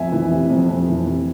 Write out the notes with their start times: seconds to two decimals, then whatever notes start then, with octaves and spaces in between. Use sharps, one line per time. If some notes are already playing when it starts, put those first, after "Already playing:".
Already playing: F2 E5 G#5
0.12 E3
0.31 C3
0.50 F2
0.69 F2
0.88 E3
1.06 C3